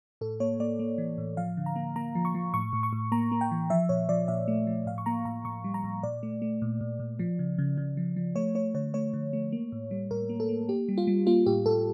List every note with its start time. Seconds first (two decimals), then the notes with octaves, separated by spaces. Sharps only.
0.21 A2 A4
0.40 A#3 C#5
0.60 A#3 D5
0.79 A#3
0.98 E3
1.18 A2
1.37 F3 F5
1.57 D3
1.66 A#5
1.76 A#3
1.96 A#3 A#5
2.15 F3
2.25 C#6
2.35 F3
2.53 A2 C#6
2.73 A2
2.83 C#6
2.93 A2
3.12 A#3 A#5
3.32 A#3
3.41 G5
3.51 E3
3.70 F3 E5
3.89 A#2 C#5
4.09 F3 D5
4.28 A#2 E5
4.48 A3
4.67 F3
4.86 A2 F5
4.98 C#6
5.06 A#3 A#5
5.25 A2 A#5
5.45 A2 C#6
5.64 G3
5.74 A#5
5.84 A2
6.03 A#2 D5
6.23 A3
6.42 A3
6.62 A#2
6.81 A#2
6.99 A#2
7.19 F3
7.39 C#3
7.58 C#3
7.77 C#3
7.97 F3
8.16 F3
8.36 A3 C#5
8.55 A3 C#5
8.74 D3 C#5
8.94 A3 C#5
9.13 D3
9.33 A3
9.52 A#3
9.72 A2
9.91 G3
10.11 A2 A#4
10.29 A#3
10.40 A4
10.49 A#3
10.69 A#3 G4
10.89 G3
10.98 F4
11.07 G3
11.26 A#3 F4
11.46 A2 G4
11.66 A2 A4